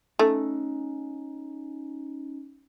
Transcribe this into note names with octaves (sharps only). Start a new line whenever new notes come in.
A3 C#4 D#4